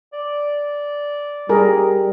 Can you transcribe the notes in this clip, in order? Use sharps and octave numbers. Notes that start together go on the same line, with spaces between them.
D5
G3 G#4 A#4